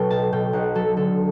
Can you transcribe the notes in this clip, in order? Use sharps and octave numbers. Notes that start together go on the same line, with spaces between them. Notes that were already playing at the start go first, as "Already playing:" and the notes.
Already playing: B2 F#3 A4 B4 C#5 G5
B1 A5
B2 G5
B1 F#5
F#3 A4
D3 A4